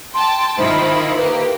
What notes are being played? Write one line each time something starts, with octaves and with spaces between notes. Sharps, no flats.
G5 A5 C6
D#3 E4 F4 C5
A#3 G4 B4